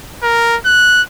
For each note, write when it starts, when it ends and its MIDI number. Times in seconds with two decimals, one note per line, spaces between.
0.23 0.56 70
0.65 1.02 90